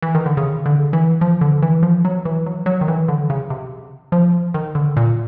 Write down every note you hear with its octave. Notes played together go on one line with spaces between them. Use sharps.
E3
D#3
D3
C#3
D3
E3
F3
D3
E3
F3
F#3
E3
F#3
F#3
D#3
E3
D3
C#3
C3
F3
D#3
D3
A#2